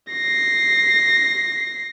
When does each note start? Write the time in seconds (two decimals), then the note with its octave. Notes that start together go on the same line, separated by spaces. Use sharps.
0.12 A#6 C7